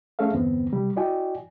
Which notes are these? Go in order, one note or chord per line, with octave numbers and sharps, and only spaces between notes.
A3 C#4 G#4 A4 E5 F5
E2 G2 D3 B3 C4
C3 G3
E4 F#4 D5 D#5 G5 G#5